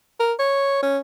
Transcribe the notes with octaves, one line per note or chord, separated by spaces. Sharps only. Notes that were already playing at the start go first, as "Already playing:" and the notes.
A#4
C#5
C#4